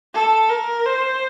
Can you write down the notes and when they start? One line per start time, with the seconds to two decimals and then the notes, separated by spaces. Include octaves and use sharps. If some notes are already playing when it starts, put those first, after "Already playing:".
0.14 A4
0.50 A#4
0.86 C5